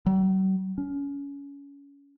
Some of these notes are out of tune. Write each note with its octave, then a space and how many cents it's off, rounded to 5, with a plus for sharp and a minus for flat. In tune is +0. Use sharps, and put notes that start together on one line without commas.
F#3 +45
C#4 +25